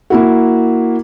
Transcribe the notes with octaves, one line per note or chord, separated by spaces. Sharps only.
A#3 E4 F#4